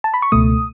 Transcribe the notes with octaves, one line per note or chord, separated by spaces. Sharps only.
A5
B5
C#6
C#2 B2 A3 D#6